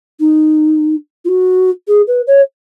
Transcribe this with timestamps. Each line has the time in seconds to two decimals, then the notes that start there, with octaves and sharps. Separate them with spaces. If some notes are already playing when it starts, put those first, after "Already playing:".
0.20 D#4
1.24 F4
1.28 F#4
1.88 G#4
2.07 B4
2.27 C#5